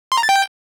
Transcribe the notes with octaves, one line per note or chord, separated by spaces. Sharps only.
C6
A#5
A6
G5